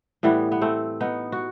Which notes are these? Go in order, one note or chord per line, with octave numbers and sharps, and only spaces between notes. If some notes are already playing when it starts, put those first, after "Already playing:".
A2 E3 G3 B3
B3
A3 C4
B3 D#4
F#4